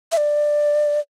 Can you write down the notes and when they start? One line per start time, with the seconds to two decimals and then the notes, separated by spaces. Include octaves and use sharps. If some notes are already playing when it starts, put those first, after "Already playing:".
0.12 E5
0.17 D5